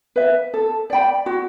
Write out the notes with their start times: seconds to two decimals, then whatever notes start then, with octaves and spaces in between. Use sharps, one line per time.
0.16 B4 E5
0.54 A4
0.90 D5 G5 B5
1.26 F#4